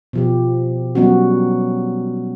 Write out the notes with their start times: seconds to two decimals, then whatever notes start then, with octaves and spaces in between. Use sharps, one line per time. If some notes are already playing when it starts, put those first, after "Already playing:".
0.13 B2 F3 G4
0.95 F#3 G3 B3 C#4 F#4